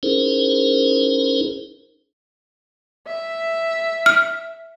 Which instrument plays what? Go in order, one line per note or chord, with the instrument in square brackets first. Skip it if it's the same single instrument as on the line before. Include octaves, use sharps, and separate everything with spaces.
[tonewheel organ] C#4 D#4 E4 G#4 A#4 C5
[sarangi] E5
[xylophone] F6